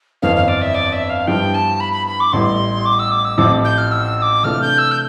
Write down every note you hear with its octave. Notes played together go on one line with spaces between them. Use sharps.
G1 F2 E3 B3 F5
F5
D5
E5
D5
E5
F5
G2 F3 B3 E4 G4 G5
A5
B5
B5
B5
D6
A1 A2 G3 B3 E4 C6
D6
E6
D6
E6
A1 A2 F3 C4 E4 D6
G6
F6
E6
E6
D6
C3 E3 A3 D4 F4 F6
G6
E6
G6